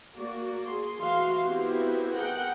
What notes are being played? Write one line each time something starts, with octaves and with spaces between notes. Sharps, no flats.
A#3 F#4 D5
G#4 C6
E3 F#4 F5 C6
B3 C4 E4 F#4 G4
G#4 A#4 F#5 G5